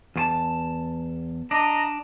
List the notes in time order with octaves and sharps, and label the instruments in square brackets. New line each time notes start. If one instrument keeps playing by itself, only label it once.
[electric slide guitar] E2 F4 A5
[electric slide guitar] D4 [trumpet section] D#5 A#5